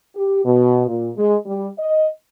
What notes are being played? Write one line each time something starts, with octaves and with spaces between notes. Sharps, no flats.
G4
B2
A#2
G#3
G3
D#5